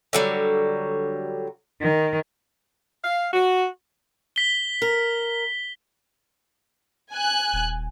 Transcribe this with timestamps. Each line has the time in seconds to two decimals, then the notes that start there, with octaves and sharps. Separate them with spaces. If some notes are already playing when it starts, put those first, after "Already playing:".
0.13 D3 F#3 G3
1.81 D#3
3.04 F5
3.33 F#4
4.36 B6 G7
4.82 A#4
7.13 G#5 F#6
7.53 D#1